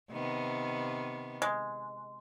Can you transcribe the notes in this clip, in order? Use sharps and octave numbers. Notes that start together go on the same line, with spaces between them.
C3 D#3 B3
G#3